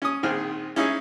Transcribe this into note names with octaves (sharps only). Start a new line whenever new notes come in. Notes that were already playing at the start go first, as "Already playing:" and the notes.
C#4 D#6
A#1 D#3 C4 G#4 G5 F6
C#4 D#4 E4 G#4